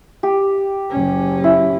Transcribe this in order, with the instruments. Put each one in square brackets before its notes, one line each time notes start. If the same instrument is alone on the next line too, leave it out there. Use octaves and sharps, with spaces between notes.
[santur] G4
[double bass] F#1 C#4
[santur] E4